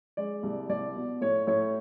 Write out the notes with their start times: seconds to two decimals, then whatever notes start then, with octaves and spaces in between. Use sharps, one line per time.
0.17 G#3 D5
0.43 C2
0.69 C2 D5
0.96 B2
1.21 A2 C#5
1.47 A2 C#5